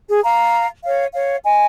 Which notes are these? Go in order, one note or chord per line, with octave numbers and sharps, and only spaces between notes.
G#4
F5 A#5
C#5 F5
C#5 F5
D#5 G#5